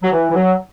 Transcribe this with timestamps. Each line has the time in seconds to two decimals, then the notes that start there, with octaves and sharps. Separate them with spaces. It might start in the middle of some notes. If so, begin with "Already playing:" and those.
0.03 F#3
0.12 E3
0.30 E3
0.35 F#3